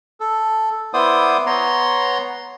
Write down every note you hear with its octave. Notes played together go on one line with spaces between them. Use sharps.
A4
B3 E4 C5 D5 D#6
B3 C#5 A#5 C6